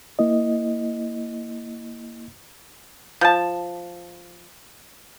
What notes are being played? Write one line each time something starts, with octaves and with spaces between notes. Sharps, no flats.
A#3 E4 D#5
F3 A5